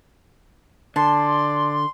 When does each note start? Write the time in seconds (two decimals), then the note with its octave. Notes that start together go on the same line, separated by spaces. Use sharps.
0.96 D3 D5 A5 C6